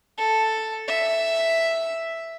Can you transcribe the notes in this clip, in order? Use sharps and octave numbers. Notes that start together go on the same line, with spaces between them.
A4
E5